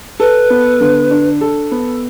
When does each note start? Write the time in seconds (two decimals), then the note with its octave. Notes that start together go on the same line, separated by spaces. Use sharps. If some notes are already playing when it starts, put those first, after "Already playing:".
0.20 A4 B4
0.50 B3
0.81 D3
1.11 D4
1.41 A4
1.71 B3